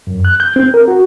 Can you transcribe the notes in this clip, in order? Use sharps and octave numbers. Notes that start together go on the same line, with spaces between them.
F#2
F#6
G6
C4
A#4
F#4